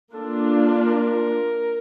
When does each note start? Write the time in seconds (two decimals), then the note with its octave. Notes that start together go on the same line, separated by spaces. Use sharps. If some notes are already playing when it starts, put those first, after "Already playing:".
0.14 A#3 D4 F4 A4
0.85 A#4